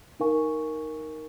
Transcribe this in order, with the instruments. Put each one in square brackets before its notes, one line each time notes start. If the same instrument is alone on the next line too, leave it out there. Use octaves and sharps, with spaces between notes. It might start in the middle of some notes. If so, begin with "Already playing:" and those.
[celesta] D#4 A#4 F5 G#5 C#6